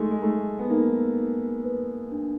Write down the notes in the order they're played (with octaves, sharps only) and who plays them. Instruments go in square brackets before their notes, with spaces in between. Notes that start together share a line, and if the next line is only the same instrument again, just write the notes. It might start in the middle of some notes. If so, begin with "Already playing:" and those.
Already playing: [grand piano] G#3 A3 [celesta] D#4
[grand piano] G#3
[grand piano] A3 [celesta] D#4
[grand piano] B3
[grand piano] A#3 [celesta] D#4
[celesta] D#4
B4
D4